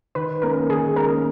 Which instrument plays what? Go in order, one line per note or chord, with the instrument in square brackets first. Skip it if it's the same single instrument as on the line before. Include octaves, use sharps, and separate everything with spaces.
[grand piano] D#3 [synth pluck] B4
[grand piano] A#3 C#4 [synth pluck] A#4
[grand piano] D#3 [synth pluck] G#4
[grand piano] A#3 C#4 [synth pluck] A#4